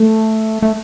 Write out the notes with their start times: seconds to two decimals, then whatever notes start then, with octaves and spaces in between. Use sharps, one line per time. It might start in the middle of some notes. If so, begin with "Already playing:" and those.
Already playing: A3
0.63 A3